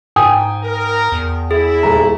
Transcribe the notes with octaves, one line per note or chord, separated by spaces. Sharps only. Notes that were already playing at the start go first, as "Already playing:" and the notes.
G#2 G5 G#5 D#6
A#4
E2
E4 G#4
D#1 A#5